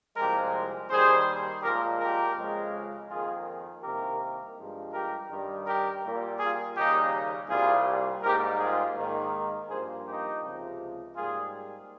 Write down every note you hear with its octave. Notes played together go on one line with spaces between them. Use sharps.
C2 A#2 F3 G#3 G4 A#4
D#2 D#3 G3 G#4 C5
A#2 F3 G#3 G4 A#4
G4 A#4
F2 C#3 F3 G#3
F2 D#3 A#3 F4 G#4
C2 C3 D#3 A#3 G4 A#4
G2 F3 G#3
G4 A#4
G2 D#3 G3
G4 A#4
A#2 G3 A#3
F4 G#4
D#2 C#3 G3 A#3 D#4 G4
C2 A#2 G3 A#3 F4 G#4
G#2 G3 A#3 G4 A#4
F4 G#4
G#2 D#3 A#3
G2 F3 A#3 G#4 C5
D#4 G4
C#2 C3 F3
G#2 G3 A#3 F4 G#4